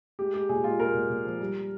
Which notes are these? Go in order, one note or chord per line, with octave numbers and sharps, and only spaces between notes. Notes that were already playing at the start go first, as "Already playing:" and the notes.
G#3 G4
G#3 G4
A#2 G#4
G#3 F4
G#3 A#4
A#2
A#2
F3
G3